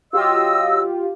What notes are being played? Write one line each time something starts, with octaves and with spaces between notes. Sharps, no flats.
F#3 F4 G4 D#5 E6